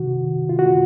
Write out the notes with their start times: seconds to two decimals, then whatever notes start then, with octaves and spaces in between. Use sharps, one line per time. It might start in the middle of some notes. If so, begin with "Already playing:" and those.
Already playing: C3 D#3 F#4
0.49 F4
0.59 F#4